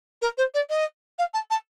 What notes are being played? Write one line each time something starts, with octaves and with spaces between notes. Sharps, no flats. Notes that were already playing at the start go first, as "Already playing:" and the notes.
A#4
C5
D5
D#5
F5
A5
A5